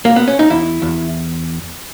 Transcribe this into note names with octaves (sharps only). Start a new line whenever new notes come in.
A#3
B3
C#4
D#4
E2 E4
E2